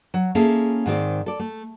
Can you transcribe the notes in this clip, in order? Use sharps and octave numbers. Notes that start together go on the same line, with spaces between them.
F#3
A#3 C#4 E4 G#4 A4
G#2 D#3 C4 D5
A4 D5
A3